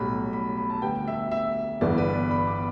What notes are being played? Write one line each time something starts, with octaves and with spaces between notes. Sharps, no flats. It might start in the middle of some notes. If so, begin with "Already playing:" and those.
Already playing: B1 A2 G3 B5
B5
B5
A5
D2 D3 G3 B3 G5
E5
E5
G1 G2 E3 B3 D5
B4
D5
B5
D6